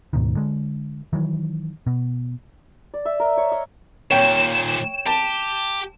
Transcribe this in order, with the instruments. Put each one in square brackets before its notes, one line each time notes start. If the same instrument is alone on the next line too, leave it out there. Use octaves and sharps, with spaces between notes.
[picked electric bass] D2 G#2 B2 D#3
D3 G#3
D#3 E3 F#3
B2
[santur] D5
E5
A#4
C#5
D#5
[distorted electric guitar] D#2 A#2 [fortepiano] C#5 G5 [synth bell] E7
[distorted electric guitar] G4 [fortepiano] A5